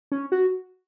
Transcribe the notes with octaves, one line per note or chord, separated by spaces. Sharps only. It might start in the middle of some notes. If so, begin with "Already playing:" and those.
C#4
F#4